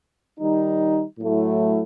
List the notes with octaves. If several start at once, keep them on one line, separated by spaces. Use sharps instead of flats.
D#3 G3 D#4
A2 F#3 A3 E4